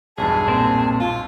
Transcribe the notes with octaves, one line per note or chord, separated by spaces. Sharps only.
B1 E2 G2 G#4 A5
A#2 C4
F4